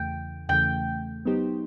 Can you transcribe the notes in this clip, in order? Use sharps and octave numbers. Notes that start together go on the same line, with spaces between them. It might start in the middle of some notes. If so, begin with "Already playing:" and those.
Already playing: E2 C#3 E3 A3 G5
E2 C#3 E3 A3 G5
F#3 B3 D#4 G4 C5